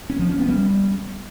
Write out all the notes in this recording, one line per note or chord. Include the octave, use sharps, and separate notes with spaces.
C#4
F3
C#4
B3
G3